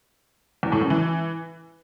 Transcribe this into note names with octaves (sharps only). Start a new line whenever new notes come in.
E2
A2
F#2
E3